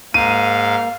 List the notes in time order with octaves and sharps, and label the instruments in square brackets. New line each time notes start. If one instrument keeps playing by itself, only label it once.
[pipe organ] G#2 F5 [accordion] A#3 [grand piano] D#7